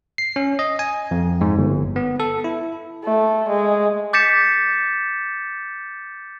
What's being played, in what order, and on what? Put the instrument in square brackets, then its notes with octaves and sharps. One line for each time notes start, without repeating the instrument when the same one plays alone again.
[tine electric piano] C7
C#4
D#5
G#5
F2
G#2
G1
B3
A4
E4
[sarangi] A3
G#3
[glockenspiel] D6 G6 A6 B6 C#7 E7